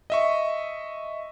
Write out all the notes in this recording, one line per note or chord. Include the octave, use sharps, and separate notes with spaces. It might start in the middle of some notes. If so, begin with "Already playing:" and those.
D#5 E5 C#6